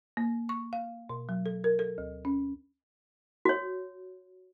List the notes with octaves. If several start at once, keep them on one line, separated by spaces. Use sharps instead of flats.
A#3
C#6
F5
B2
F#3
A4
A#4
A4
D2
C#4
F#4 C#5